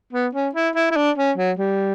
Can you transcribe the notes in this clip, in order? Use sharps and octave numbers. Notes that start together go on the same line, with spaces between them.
B3
C#4
E4
E4
E4
D4
C#4
F#3
G3